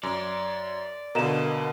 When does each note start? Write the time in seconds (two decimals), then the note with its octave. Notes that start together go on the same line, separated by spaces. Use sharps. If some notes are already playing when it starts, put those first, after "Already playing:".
0.03 F#2 D5
1.15 B2 D3 A#4 D#5 F5 A#5 E7